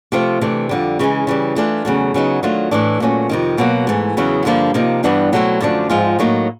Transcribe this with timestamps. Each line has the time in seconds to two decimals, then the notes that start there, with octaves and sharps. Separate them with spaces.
0.12 C3 F3 A3 C4 F4
0.41 C3 E3 A3 D4
0.69 F2 D3 G3
0.99 C#3 E3 G#3 C#4
1.27 C#3 E3 G3
1.56 E3 A3 D4 F4
1.85 E2 C#3 F#3 A3
2.14 C#3 F#3 B3 D#4
2.43 D#3 F#3 A3 D4 F4
2.71 A2 E3 A3 D4
3.00 A#2 F#3 A3 C#4
3.29 F2 C3 D#3
3.58 B2 F#3 A#3
3.87 G#2 E3 A3
4.17 E2 C#3 F#3 B3 E4
4.45 G2 D3 F3 A#3 D4
4.74 C3 F3 A#3 D#4
5.04 G2 E3 G3 B3 D4
5.32 B2 F#3 A3 C4 E4
5.61 F#2 D3 F3 A3 D4
5.90 G#2 F3 G#3 C4 F4
6.19 A2 F#3 A#3 D#4